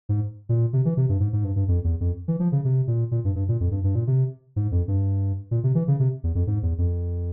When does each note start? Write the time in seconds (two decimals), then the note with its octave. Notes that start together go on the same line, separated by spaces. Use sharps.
0.09 G#2
0.49 A#2
0.73 C3
0.85 E3
0.97 C3
1.09 G2
1.20 G#2
1.33 G#2
1.44 G2
1.56 G2
1.68 F2
1.84 E2
2.00 F2
2.28 E3
2.40 F3
2.52 C#3
2.65 C3
2.87 A#2
3.11 A#2
3.25 G2
3.36 G2
3.48 A#2
3.60 F2
3.71 G2
3.84 G2
3.95 A#2
4.07 C3
4.56 G#2
4.72 F2
4.88 G2
5.51 A#2
5.64 C3
5.75 E3
5.88 C#3
6.00 C3
6.24 E2
6.35 F2
6.47 G#2
6.62 E2
6.78 F2